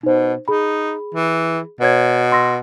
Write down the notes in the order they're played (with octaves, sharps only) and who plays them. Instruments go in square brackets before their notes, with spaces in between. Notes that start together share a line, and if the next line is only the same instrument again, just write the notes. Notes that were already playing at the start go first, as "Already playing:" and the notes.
[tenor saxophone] B2 [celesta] D#4 C5
[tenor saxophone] D#4 [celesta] G#4 B5
[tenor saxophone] E3
[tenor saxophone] B2 [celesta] B4 C#5 G#6
[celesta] C6 E6 A#6